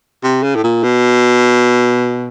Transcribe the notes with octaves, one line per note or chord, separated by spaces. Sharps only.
C3
C#3
A2
A#2
B2